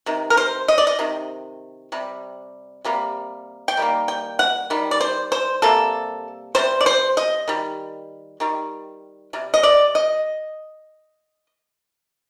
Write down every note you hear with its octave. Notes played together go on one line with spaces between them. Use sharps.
C3 D#3
A#4
C5
D#5
D5
D#5
C3 D#3
C3 G3
C3 G3 A#3
G5
D#3 G3 A#3
G5
F#5
D#3 G3
D5
C5
C5
C3 G3 A#3 A4
C3 G3 C5
D5
C5
D#5
D#3 G3
D#3 G3
C3 G3
D#5
D5
D#5